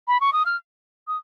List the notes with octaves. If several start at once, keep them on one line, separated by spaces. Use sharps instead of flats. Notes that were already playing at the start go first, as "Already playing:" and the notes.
B5
C#6
D#6
F6
D#6